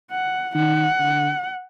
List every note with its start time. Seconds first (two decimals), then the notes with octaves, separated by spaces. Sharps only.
0.11 F#5
0.55 D#3 F#5
0.99 D3